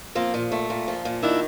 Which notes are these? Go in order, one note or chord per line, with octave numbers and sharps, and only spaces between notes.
F3 A#3 C4
A#2
A3
A#2
F3
A#2
D#3 D4 E4